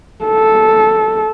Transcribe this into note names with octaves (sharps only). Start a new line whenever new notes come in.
A4